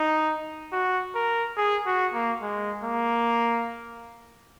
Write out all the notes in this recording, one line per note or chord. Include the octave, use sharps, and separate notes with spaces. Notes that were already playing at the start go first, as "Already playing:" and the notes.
Already playing: D#4
F#4
A#4
G#4
F#4
A#3
G#3
A#3